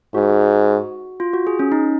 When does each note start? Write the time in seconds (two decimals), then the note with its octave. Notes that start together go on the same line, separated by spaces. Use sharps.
0.15 G#2 F#4
1.20 F4
1.33 F#4
1.47 G#4
1.59 C#4
1.72 D#4